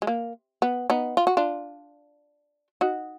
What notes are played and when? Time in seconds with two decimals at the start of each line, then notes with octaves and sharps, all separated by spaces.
0.02 G#3
0.07 A#3
0.62 B3
0.90 B3 D#4
1.17 F4
1.27 F#4
1.37 D4 F4
2.81 D#4 F#4